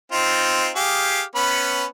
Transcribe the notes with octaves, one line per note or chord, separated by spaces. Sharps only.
C4 D#4 F4
G4 G#4 F5
B3 C#4 B5